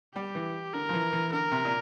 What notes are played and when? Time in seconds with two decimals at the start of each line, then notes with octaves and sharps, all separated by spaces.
0.15 G3 G4
0.35 E3
0.73 D3 A#4
0.89 F3
0.93 E3
1.13 E3
1.32 D3 A#4
1.52 C3
1.65 A#2